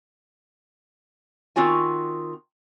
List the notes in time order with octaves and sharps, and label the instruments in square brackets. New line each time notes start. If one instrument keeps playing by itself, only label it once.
[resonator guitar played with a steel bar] D#3 C4 F4 F#4 G#5